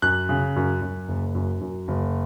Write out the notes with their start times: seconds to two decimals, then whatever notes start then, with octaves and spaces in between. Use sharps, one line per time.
0.02 F#2 F#6
0.29 C#3
0.56 F#2
0.82 F#2
1.08 F#1
1.35 F#2
1.61 F#2
1.88 F#1